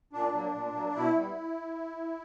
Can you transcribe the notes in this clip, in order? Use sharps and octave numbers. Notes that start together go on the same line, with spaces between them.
A#2 D4
F#3 A#3
A#2
F#3 A#3
B2 E4
G3 B3